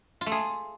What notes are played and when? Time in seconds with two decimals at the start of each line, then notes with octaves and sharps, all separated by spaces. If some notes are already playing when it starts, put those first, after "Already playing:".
0.21 F4
0.26 A3
0.32 G#4